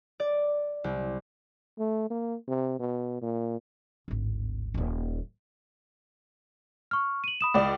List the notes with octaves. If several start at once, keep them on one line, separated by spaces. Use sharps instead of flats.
D5
C2
A3
A#3
C3
B2
A#2
D1 G#1
D#1 A#3
C#6 F6
D#7 F#7
B5 D#6 E7
C#2 D5